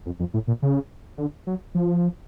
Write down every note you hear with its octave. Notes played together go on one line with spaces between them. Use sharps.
F2
F2
A2
A#2
C#3
D3
F#3
F3